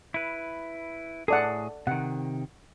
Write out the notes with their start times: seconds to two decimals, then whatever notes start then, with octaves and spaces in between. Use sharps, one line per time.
0.14 E4 B4
1.28 A2 G#4 A4 D5 F#5
1.87 C3 D#3 F#5